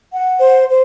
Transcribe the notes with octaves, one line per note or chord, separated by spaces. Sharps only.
F#5
C5
C5